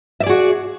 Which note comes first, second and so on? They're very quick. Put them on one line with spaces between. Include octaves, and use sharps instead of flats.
E5 D5 G#4 F#4